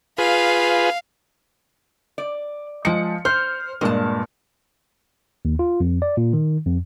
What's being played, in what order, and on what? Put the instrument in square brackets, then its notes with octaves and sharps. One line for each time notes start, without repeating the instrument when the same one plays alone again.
[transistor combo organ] F4 G#4 B4 [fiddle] F5
[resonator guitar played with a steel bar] D5
[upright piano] F3 C#7 [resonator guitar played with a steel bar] G#3
[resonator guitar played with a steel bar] C5 [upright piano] F6
[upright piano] G2 A#2 [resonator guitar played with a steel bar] G#3 A5
[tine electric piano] D#2
F4
F2
D5
A#2
D#3
F2